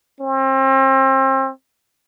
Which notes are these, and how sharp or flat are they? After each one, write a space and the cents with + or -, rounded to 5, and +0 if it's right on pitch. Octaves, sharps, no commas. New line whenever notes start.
C4 +35